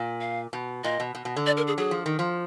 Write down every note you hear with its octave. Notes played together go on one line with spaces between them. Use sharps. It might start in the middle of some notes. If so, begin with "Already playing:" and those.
Already playing: A#2
F5
B2
A#2 D#5
B2
B2
B2
D3
D5
A#4
G#4
F#3 G#4
F3
D#3
F3